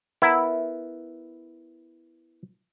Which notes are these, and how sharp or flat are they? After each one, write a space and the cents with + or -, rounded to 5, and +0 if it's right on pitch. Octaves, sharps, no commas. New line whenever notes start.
B3 +0 E4 +0 A#4 +0